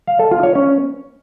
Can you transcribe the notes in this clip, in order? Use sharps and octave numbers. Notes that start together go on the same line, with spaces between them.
F5
A4
F4
C#5
C#4